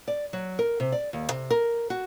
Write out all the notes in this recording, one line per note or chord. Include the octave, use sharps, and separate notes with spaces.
D5
F#3
A#4
C3
D5
D#2
C3
A#4
F#4